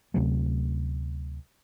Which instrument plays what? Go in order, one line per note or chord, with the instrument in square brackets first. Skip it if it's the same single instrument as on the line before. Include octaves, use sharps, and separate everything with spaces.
[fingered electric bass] D2 C3 F#3 A3